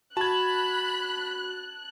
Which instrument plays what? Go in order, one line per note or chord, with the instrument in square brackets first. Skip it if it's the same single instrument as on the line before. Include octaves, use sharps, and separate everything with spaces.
[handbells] F#4 [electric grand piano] A5 G#6 [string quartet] B5 [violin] F#6